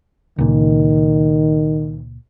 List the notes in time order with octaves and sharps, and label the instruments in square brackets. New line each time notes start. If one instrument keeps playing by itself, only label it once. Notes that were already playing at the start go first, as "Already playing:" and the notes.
[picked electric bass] C#2 A#2 [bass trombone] D#3